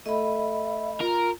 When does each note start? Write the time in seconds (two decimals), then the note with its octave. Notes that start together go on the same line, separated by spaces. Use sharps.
0.06 A3 D#5 E5 B5
1.00 F4 A#4